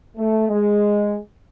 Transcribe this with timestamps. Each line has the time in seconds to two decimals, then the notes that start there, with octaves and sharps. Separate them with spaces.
0.17 A3
0.49 G#3